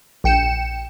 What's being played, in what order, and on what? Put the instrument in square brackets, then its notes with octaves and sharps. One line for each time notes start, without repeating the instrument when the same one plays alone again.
[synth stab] A#1 G5 C#7 E7